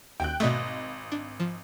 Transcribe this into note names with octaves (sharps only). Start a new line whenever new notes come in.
D#2 G5 F#6
G#1 B2 A3 D#5
D4
F3